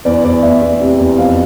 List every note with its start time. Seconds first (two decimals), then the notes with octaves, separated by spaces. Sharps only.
0.05 E2 D5
0.24 E2 D5
0.42 E2 E5
0.62 E2
0.80 C3
0.99 E2
1.17 F2 F5